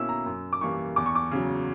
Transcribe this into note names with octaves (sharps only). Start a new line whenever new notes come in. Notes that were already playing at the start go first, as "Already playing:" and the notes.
Already playing: B2 A#3 C#4 E4 E6
A#5
F#2
D6
E3 G3 A#3 C#6
E2 D6
C#6
D6
C#3 F#3